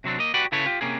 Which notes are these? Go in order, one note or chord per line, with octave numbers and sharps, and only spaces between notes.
C3 F#3 C4 D4
A#3 D#5
F#4 G4 B4 D5 F#5
C#3 E4 A4 B4 C#5
F4 G4
C3 A#3 C#4 G#4